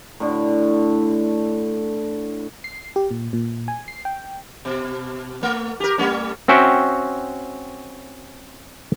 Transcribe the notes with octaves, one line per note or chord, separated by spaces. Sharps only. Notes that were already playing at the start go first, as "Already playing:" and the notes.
A2 D3
C7
G4
A#2
A#2
G#5
C7
G5
B2
A3
G4 A#4
G3 A3 C#4
C4 C#4 F#4 E5 G5